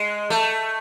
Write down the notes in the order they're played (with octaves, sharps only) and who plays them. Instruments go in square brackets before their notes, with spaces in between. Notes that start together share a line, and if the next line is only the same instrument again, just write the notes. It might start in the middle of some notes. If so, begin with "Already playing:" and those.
Already playing: [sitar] G#3
A3